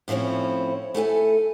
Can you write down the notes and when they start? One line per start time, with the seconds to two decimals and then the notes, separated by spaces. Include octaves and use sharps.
0.08 A2 F3 C4 C#4 E4
0.94 A3 E4 A4 G#5